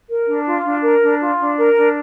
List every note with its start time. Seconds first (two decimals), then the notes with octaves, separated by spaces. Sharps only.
0.09 A#4
0.28 D4
0.46 F4
0.65 D4
0.84 A#4
1.02 D4
1.21 F4
1.39 D4
1.58 A#4
1.77 D4